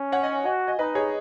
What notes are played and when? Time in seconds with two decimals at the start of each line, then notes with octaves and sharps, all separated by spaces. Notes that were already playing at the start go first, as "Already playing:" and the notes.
Already playing: C#4
0.12 C#5 F#5
0.23 D#5 G#5
0.45 F#4 D#5 G#5
0.67 D#5 G#5
0.79 D#4 B4 D#5
0.95 G#4 C#5